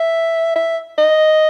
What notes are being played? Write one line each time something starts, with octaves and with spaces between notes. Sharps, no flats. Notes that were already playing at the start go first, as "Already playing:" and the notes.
Already playing: E5
E5
D#5